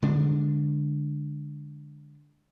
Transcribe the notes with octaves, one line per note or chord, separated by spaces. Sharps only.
D3 G#3 D4